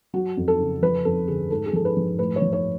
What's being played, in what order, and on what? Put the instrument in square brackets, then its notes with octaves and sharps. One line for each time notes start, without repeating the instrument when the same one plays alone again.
[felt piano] F#3 F#4
F2
A4
C#3
F3 B4
F2 A4
D3 G#4
G#2 A4
G#4
F3 A4
B4
F3
A2 B4
C#5
F3
C#5